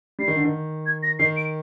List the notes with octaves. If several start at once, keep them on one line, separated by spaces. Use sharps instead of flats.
G3 C7
D#3
D3
D#3
G#6
A#6
D#3 C7
D7